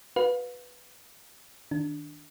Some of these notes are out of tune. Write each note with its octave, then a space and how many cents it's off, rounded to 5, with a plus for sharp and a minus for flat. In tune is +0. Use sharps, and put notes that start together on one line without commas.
F#4 +0 B4 +0 F5 +35
D#3 +0 D4 +0